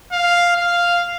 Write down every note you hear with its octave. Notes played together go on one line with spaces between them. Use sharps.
F5
F5